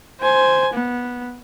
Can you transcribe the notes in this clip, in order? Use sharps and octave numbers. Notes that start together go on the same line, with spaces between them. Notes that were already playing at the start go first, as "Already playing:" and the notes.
C5 G#5
B3